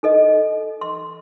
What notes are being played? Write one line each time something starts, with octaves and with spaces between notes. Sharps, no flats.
D#4 A4 D#5
C6